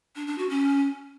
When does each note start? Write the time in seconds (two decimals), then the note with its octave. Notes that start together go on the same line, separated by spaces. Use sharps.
0.16 D4
0.27 D4
0.38 F#4
0.49 C#4